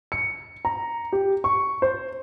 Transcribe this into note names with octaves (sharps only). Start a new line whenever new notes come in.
C#7
A#5
G4
C#6
C5